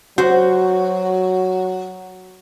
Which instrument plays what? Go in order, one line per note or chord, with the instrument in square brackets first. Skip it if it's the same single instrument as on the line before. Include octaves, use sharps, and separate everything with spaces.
[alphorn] F#3 [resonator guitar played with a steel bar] F#4 [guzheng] C5